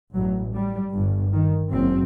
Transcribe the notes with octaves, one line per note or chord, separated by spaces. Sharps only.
A1 G2 F#3
G3
G1 G2
D#3
F#1 F#2 C4